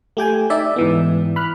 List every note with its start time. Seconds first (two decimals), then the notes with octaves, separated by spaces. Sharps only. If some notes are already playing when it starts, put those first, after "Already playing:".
0.17 A3 G4 G5 G#5
0.50 D#4 D5 E5
0.76 G#2 E3 B3
1.36 B5 F6 F#6